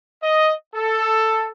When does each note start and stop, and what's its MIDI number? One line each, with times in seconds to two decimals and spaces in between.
0.23 0.54 75
0.75 1.49 69